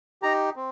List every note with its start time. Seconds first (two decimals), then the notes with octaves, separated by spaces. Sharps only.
0.22 D#4 G4 A#5
0.56 C4